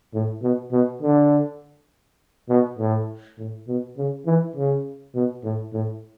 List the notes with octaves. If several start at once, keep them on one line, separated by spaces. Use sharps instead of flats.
A2
B2
B2
D3
B2
A2
A2
B2
C#3
E3
C#3
B2
A2
A2